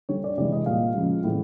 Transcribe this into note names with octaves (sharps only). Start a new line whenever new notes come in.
D3 G3 C#5
D5
C3 E3 G#3 D5
D#5
A#2 G3 F5
C#3 F3 G#3
A2 E3 G#3